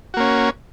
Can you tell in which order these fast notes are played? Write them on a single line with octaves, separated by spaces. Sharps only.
F#4 A#3 C#4